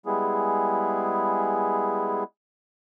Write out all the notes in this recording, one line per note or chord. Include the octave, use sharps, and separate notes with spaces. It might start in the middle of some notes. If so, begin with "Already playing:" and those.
G3 G#3 B3 E4 G#4